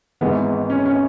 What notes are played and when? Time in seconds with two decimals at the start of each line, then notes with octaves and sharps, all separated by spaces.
0.21 G#1 G#2 E3 B3
0.70 C#4
0.86 C#4